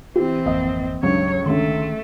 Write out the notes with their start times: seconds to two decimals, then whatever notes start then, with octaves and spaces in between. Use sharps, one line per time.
0.16 E3 C4 E4 G4
0.46 G#1 F2 A#3 D#5
1.03 C#2 G2 F#3 C#5
1.46 C#2 D3 D#3 A3 C6